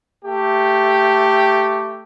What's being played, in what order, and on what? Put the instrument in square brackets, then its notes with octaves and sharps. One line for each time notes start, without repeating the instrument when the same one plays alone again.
[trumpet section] A3 G4